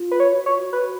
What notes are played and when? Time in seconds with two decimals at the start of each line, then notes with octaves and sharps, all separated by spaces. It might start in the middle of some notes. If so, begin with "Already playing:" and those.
Already playing: F4
0.11 B4
0.20 C#5
0.33 F#4
0.46 C#5
0.72 F#4 B4